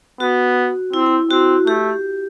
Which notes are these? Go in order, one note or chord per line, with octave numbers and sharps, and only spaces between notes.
B3 F#4
C4 E4
E4
C4 F#4
A3 G4